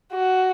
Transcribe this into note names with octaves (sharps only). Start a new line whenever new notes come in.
F#4